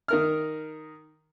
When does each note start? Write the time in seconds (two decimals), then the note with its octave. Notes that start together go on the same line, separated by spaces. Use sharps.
0.08 D#3 A#4 F6